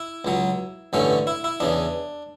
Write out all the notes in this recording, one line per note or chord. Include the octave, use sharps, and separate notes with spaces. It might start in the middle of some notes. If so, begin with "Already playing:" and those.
Already playing: E4
C#2 C#3 F#3
A1 G2 D3 A3 C#4
E4
E4
E2 C#3 E3 D4